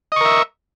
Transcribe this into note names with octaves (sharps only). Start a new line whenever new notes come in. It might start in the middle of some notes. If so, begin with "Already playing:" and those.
A#4 D#5 E5 C#6